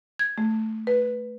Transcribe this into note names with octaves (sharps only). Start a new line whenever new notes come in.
G#6
A3
B4